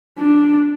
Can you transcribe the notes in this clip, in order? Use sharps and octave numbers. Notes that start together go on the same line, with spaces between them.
D4